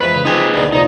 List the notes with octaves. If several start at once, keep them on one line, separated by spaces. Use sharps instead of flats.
F2 G#2 E3 B4
C#3
F3 D#4 G4 G#4 B4
D2 B2 D#3
C2 F2 A#2 D#4